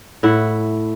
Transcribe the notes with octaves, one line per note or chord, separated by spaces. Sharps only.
A2 E4 F#5